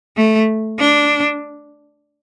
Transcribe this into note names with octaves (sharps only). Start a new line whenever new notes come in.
A3
D4